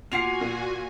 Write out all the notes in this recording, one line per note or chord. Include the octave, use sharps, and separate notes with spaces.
A#3 F4 F#4 F#5 G#5 C7 F7
A#2